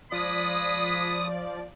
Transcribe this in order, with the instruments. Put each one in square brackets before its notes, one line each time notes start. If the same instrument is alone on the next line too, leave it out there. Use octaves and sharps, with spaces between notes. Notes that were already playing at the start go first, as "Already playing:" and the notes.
[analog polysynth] F3 D5 [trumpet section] G#3 B5 [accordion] D#6